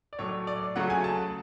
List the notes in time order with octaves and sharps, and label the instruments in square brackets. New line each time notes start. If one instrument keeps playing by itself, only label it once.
[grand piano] D5
A2 F#3 A3 C#5
D5
C#3 F#3 A3 F#5
G#5
A5